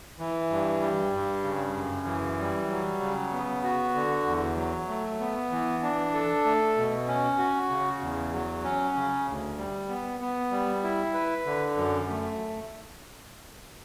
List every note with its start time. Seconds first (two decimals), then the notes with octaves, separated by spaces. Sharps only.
0.20 E3
0.50 G2
0.81 G3
1.13 G2
1.44 C#3
1.76 F#2
2.07 E3
2.39 G3
2.70 F#3
3.01 C#3
3.33 B3
3.63 F#4
3.95 D3
4.26 E2
4.57 F#3
4.88 A3
5.20 B3
5.52 E3
5.83 D4
6.14 A4
6.45 A3
6.77 B2
7.08 C#4
7.38 F#4
7.70 C#3
8.01 E2
8.33 F#3
8.64 C#4
8.96 C#3
9.27 D2
9.57 G3
9.89 B3
10.20 B3
10.51 G3
10.83 E4
11.14 B4
11.46 D3
11.76 F#2
12.09 A3